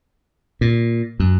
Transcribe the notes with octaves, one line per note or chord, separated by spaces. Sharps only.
A#2
F#2